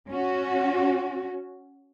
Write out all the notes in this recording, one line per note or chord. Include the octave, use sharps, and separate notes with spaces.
C#4 F#4